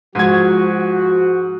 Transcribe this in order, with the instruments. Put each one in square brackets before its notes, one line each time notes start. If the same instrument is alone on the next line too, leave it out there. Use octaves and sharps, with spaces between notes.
[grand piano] G#2 G#6 [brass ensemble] F3 F#4